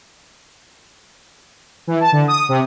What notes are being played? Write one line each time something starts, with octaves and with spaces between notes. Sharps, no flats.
E3
A5
D3
D#6
C3